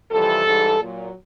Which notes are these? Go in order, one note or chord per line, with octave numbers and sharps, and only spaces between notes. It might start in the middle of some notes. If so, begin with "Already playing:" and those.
F2 C3 E3 G3 A4
G#2 E3 G3
A#2 F#3